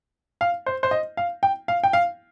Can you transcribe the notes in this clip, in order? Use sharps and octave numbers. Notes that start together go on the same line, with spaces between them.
F5
C5
C5
D#5
F5
G5
F5
G5
F5